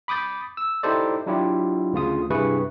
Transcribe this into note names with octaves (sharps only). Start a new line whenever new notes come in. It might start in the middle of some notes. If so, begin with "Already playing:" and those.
B5 D6 D#6 G6 A6
E6
D#4 E4 G4 A4 C5 D5
F#3 D4 E4 F4 G4
D2 C#3 F4 D#6
G2 C3 E4 G#4 B4 C#6